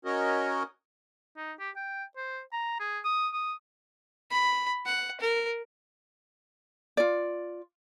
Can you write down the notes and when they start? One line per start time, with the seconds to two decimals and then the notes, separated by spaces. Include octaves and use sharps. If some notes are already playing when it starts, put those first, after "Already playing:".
0.05 C#4 F#4 A#4 C#5 D#5
1.37 D#4
1.60 G4
1.76 G5
2.17 C5
2.52 A#5
2.80 G#4
3.05 D#6
3.34 D#6
4.30 B5
4.86 F#5
5.20 A#4
6.97 F4 D5